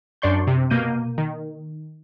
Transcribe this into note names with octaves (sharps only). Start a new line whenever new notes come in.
F#2 D4 D5 C6 C#6 G6
C3
B2 A#3 G6 D#7
D#3